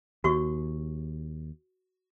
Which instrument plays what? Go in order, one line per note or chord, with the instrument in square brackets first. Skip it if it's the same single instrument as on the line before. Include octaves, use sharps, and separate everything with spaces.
[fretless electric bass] D#2 [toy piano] F#4 C#6